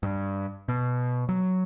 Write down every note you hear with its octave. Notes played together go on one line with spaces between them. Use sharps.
G2
B2
F#3